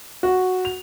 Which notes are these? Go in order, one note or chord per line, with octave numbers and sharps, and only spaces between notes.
F#4
F7